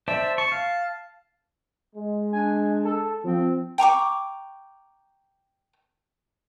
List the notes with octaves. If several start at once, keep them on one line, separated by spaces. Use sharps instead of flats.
C5 D5 E5 A5
A5 C#6
F5
G#3
D4 G#5
A4
F3 C4
G5 A#5 C#6 D6